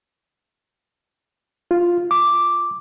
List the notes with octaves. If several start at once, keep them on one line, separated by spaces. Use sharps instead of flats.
F4
D6